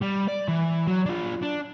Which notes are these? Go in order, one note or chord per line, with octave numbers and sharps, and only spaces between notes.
G3
D5
E3
F#3
D4 F4
D4